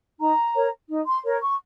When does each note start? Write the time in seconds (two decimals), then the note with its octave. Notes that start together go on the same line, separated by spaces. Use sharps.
0.19 D#4 A#5
0.55 A#4 C#5
0.89 D#4
1.07 C6
1.25 A#4 C#5
1.42 C#6